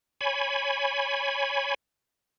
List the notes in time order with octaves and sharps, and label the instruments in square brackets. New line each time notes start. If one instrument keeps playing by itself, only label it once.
[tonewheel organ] C#5 G#5 B5